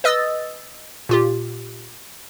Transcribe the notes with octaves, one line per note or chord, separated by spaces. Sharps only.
B4 D#5 D#6 E6 A6
A#2 F4 G4